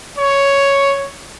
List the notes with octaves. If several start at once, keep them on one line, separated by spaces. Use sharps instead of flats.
C#5